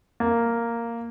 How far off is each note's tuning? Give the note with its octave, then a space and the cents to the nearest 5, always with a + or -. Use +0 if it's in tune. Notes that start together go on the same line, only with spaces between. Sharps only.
A#3 -5